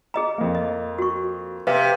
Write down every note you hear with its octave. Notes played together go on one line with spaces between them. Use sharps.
G#4 D#5 A#5
F2 A#3
D#5
F#4 C#6
C3 B4 F5